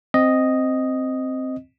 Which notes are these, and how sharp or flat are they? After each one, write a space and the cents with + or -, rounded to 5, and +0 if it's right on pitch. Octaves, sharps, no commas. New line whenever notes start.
C4 +0 D#5 +0